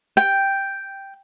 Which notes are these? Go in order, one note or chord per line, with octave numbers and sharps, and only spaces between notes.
G5